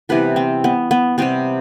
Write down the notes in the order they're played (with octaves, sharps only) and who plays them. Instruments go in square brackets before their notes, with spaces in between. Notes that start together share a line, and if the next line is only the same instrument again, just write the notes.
[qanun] C3 E3 G3 B3 B4
C4
B3
B3
C3 G3 B3 C4